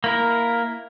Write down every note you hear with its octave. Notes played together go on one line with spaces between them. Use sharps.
A#3 E4 A#4